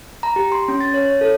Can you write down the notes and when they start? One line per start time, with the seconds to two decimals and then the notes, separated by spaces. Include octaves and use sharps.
0.23 A#5
0.36 G4
0.52 C6
0.68 C#4
0.81 A6
0.94 C#5
1.05 C#5
1.21 A4